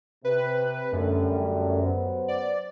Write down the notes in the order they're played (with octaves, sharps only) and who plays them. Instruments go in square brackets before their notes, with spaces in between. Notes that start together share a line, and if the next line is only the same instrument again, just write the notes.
[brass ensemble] C3 [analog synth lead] B4
[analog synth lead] F#2 [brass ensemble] D3 G3 A3
[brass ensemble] F#3 B3 C5
[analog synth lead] D5